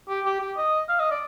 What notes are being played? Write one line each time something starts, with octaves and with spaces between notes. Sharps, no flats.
G4
G4
G4
D#5
F5
D#5
D5